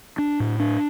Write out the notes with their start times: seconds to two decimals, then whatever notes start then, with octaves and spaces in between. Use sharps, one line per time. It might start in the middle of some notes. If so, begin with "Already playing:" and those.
0.18 D4
0.40 A2
0.60 D4